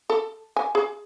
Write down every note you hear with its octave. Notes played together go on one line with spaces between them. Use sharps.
A4
G#5
G#4